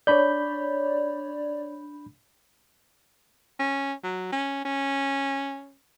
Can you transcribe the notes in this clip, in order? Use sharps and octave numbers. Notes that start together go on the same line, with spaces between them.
D4 C#5 D5 B5 G6
C#4
F#3
C#4
C#4